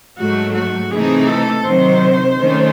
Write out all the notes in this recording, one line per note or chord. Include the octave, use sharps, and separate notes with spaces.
G#2 F#3 A3 F#4
F#4
C3 E3 A3 D#4 G#4
A4
C3 D#3 F#3 C5
D#3 A3 C#4